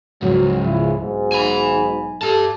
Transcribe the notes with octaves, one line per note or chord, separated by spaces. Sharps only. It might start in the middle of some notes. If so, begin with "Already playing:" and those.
C#2 G#2 F#3
C#3 E4 F4
B1 G#2
G#5 B5
G4 A4 A5